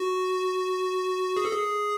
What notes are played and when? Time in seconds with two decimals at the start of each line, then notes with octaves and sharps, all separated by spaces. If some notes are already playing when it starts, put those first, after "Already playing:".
Already playing: F#4
1.37 G#4
1.45 A4
1.51 G#4